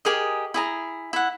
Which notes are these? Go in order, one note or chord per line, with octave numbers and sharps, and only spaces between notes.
G4 G#4 A#4 D#5
E4 G#4 A#5
E4 F#5